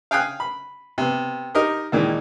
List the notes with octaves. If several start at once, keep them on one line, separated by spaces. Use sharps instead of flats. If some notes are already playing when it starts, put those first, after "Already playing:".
F5 G5 G#5 D#6 F#6
B5
C3 B3
D#4 G4 A#4 D#5
D#2 A#2 D#3 E3 G#3